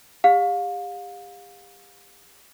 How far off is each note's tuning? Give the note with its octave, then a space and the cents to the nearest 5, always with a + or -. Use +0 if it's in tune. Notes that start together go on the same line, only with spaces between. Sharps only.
G4 +40 F5 +30